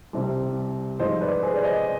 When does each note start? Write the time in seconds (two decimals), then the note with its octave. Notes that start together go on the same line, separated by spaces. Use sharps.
0.13 C2 C3 G3
0.99 G#2 F3 G#3 C5 D#5
1.21 B4 D5
1.43 G#4 C5
1.56 D5
1.64 C5 D#5